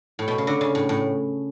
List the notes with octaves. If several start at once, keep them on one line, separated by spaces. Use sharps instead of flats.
A2
B2
C#3
D3
C#3
A2
A2